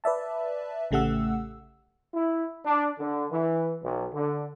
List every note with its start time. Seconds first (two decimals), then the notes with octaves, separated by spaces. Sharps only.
0.04 B4 D5 E5 A5
0.91 A1 C#3 A3 G4 F#5 E6
2.14 E4
2.66 D4
2.99 D3
3.32 E3
3.83 B1
4.13 D3